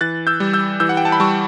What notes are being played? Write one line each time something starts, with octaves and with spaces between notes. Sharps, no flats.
E3 F#6 A6
E6 G6
G3
E6 G6
E3 E6 G6
F#5
G5
A5
B5
G3 A5 C#6